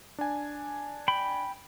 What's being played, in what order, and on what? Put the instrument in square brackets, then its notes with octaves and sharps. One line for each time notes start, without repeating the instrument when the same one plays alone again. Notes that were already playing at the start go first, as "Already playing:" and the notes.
[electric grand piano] D4 G#5
[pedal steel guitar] G5 B5